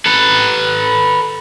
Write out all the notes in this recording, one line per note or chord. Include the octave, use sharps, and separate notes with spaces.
A4 B4